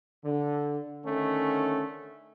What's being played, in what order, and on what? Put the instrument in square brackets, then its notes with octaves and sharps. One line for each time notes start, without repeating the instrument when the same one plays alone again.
[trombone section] D3
D3 D#3 A3 C#4